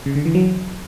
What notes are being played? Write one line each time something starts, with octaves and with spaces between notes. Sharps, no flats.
C#3
D3
E3
F#3